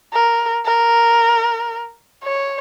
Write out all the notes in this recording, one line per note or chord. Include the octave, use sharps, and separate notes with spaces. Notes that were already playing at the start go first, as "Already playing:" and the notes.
A#4
A#4
C#5